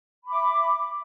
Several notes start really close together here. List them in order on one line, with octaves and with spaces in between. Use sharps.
B5 D6 E5